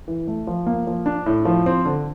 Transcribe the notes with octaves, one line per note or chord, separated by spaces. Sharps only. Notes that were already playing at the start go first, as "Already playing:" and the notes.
E3
A3
F3
A#3
F3
D4
A2
F3
C4
D3